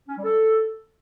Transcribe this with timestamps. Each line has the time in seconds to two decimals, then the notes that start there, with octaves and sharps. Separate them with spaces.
0.09 C#4
0.16 G3
0.24 A4